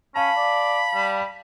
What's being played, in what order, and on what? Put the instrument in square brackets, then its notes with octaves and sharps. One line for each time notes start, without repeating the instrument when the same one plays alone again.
[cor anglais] C#4 [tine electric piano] F5 A5 [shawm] B5
[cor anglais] D5
G3